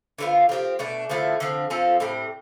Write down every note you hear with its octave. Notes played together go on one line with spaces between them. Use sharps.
D3 F3 B3 F4
F3 C4 G4
B2 A3 D4
D3 F3 A3 E4
D3 F3 C4
F3 C4 F4 A4
A2 G3 C4